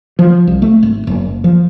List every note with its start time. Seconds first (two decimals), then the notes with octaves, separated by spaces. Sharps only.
0.19 F3
0.47 C2
0.62 A3
0.83 G#1
1.07 F#1
1.44 F3